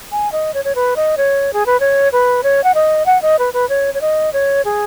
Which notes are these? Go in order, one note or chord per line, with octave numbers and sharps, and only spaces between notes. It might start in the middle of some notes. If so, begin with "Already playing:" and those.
G#5
D#5
C#5
C#5
B4
D#5
C#5
G#4
B4
C#5
B4
C#5
F#5
D#5
F#5
D#5
B4
B4
C#5
C#5
D#5
C#5
G#4